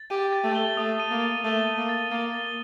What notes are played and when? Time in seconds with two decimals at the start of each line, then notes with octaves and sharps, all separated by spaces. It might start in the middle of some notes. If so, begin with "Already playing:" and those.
Already playing: A6
0.10 G4 D#7
0.33 A6
0.44 A3
0.55 G7
0.77 A3 D#6
1.00 D#7
1.11 A#3
1.22 A6
1.44 A3 G7
1.67 D#7
1.78 A#3
1.89 A6
2.11 A#3 A6
2.34 G7